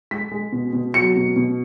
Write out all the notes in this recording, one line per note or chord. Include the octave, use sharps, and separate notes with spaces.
G#3 B6
G#3
B2
B2
F#3 C#7
B2
B2